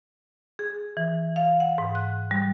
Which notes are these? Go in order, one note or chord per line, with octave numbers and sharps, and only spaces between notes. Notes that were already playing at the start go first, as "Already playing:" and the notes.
G#4
E3
F5
F#5
G#2
F#6
G3